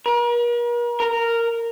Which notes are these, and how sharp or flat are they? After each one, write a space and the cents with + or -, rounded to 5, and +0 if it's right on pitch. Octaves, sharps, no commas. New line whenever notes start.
A#4 +45
A#4 -10